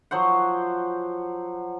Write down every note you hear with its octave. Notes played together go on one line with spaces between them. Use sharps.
F3 F#3 C5 F#5